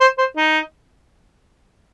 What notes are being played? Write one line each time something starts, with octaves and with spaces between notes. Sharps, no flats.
C5
C5
D#4